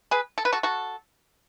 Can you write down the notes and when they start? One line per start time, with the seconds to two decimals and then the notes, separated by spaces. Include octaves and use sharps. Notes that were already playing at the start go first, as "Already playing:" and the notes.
0.11 G#4 B4
0.38 A4
0.45 B4
0.52 F#4 A4
0.63 F#4 A4